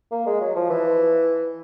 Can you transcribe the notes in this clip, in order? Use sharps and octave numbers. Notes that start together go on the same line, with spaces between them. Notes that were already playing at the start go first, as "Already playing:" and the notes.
A#3
G#3
F#3
F3
E3